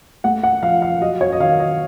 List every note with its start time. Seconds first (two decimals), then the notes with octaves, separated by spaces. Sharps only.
0.24 A3 F#5
0.43 F#5
0.62 F3 F5
0.82 F5
1.01 F#3 D#5
1.21 C#5
1.32 D#5
1.40 D#3 F5
1.60 D#5